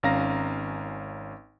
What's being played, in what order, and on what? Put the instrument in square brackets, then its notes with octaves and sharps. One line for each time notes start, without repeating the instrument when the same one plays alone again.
[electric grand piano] G#1 C#4 F5 A#5 A#6